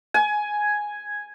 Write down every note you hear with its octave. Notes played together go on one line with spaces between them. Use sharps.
G#5